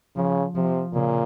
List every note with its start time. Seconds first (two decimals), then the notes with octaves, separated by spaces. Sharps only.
0.16 C#3 F3
0.55 C3 F3
0.94 A#2 C#3